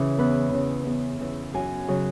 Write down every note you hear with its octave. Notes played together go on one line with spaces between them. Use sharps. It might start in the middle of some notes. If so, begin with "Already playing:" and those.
Already playing: C#3 E3
E2 B4
C#3 E3
E2
C#3 E3
F#2 G#5
C#3 F#3